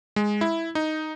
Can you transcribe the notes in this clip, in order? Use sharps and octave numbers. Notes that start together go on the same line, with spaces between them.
G#3
E4
D#4